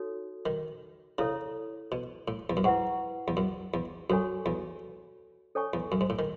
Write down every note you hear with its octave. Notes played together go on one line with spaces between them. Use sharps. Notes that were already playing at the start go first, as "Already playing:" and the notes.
Already playing: D#4 F#4 A4 C#5
D#3
C#3 E4 A4 C#5
B2
A2
E2
F#2
G#2 E4 B4 F#5 C#6
E2
F#2
E2
F#2 F#4 A4 C#5 G#5 C#6
E2
A4 C#5 G#5 C#6
E2
F#2
G#2
A2
D#3